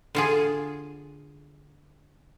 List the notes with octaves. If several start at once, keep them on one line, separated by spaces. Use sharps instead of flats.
D3 F4 G#4